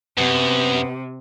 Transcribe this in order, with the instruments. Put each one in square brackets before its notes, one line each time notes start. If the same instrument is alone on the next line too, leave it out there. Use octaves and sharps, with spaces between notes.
[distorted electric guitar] F#2 [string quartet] C3 [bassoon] B3